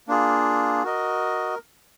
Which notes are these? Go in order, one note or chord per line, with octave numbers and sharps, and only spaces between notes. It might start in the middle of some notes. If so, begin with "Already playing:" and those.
A#3 D4 F4 G#4
F#4 A#4 D#5